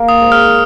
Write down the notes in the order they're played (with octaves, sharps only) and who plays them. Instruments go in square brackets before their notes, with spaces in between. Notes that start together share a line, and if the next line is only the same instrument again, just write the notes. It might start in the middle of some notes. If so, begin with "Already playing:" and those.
Already playing: [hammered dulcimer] A#3
[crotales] D#6
[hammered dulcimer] G#2
[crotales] F6